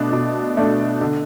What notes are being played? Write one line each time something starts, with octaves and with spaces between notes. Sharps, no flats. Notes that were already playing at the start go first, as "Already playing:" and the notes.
Already playing: B2 A3 D4
B2
A3 D4
D3